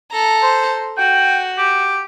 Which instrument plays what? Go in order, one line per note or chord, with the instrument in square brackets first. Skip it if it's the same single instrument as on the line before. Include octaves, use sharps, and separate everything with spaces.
[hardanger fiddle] A4 A#5
[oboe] C5
[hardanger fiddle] F#4 [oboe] G5
[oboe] G4